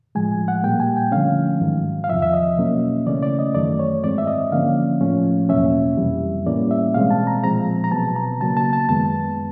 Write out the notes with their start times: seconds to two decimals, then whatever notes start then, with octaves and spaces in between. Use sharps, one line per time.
0.15 A2 F3 G#3 G#5
0.48 F#5
0.63 A#2 G3 A#3 G5
0.80 G#5
0.96 G5
1.12 D3 F3 A3 C#4 F5
1.61 G#2 D#3 F#3
2.04 F5
2.09 E2 C3 F3 E5
2.22 E5
2.33 D#5
2.58 B2 F#3 A#3 C#4
3.07 C#3 E3 A3 C#4 D5
3.22 D5
3.39 D#5
3.55 F#2 D#3 F#3 A3 D5
3.79 C#5
4.04 G#2 E3 G#3 C4 D5
4.18 E5
4.27 D#5
4.52 D3 F3 A#3 C#4 F5
5.01 A2 F3 A3 C#4
5.49 E2 B2 F#3 A#3 C#4 E5
5.97 F2 C3 E3 G3
6.46 A2 E3 G3 A#3 C#4 D5
6.71 E5
6.94 B2 G#3 C4 F5
7.10 A5
7.27 A#5
7.43 A#2 F3 G#3 C4 A#5
7.84 A#5
7.92 B2 F#3 B3 A5
8.16 A#5
8.40 C#3 F#3 A#3 A5
8.57 A5
8.73 A5
8.89 F#2 D#3 G#3 B3 A5